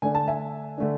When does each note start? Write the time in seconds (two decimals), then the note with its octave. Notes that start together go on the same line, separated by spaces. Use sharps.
0.02 D3 A3 D4 G#5
0.15 A5
0.28 E5 G#5
0.78 D3 A3 D4